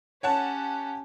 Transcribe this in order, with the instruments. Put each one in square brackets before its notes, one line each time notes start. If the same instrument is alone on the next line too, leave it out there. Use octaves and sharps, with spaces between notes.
[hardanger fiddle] C#4 G4 [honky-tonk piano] C#5 F#5 A5